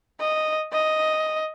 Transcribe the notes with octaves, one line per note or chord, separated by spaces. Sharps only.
D#5
D#5